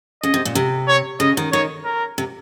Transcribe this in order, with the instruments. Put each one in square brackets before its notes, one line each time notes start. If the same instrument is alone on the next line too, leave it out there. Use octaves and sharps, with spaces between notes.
[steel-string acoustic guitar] C#3 [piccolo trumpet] D#5
[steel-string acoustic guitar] C3
A#2
C3
[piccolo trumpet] C#5
[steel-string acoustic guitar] C#3 [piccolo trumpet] D#5
[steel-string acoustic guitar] D#3
[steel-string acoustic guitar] D#3 [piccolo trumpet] C#5
[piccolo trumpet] A#4
[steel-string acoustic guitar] C3